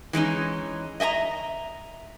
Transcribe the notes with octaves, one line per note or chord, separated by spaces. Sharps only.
E3 G#3 C#4 D#4
D#5 E5 G#5 A#5